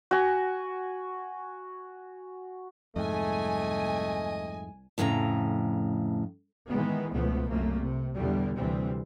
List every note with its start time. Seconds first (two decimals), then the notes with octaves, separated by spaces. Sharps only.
0.11 F#4 G#5
2.96 C2 F2 G#2 A3 D#5 G#5
4.98 F2 A2 C#3 G#4 A#5
6.69 D#3 E3 G#3 B3
7.14 C#2 B2 F3 A3 B3
7.51 C2 F#2 A3 A#3
7.80 C3
8.15 E2 B2 D3 G3
8.56 D2 C3 E3 G3 C4